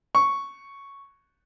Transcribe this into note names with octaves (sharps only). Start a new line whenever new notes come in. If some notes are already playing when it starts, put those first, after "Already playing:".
C#6